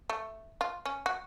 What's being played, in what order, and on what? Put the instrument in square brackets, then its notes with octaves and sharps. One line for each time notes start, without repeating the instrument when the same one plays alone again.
[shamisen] A3
F4
C#4
F#4